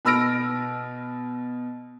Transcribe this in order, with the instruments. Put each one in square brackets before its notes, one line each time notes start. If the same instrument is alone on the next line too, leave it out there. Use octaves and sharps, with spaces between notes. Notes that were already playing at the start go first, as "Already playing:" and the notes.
[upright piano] B2 B5 E6 F6 A#6 D7